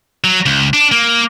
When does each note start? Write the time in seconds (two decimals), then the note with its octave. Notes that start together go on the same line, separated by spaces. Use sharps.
0.24 F#3
0.46 C#2
0.73 D4
0.92 A#3